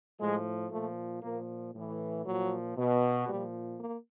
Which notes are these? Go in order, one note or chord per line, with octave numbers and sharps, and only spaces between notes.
A2 F3 G#3
A#2 F3 A3
A#2 F3 A#3
A2 E3
A#2 F3 F#3
B2
A#2 F3 G3
A#3